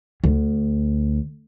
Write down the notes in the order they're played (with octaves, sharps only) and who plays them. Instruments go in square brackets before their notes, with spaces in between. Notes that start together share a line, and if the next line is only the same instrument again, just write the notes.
[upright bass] D2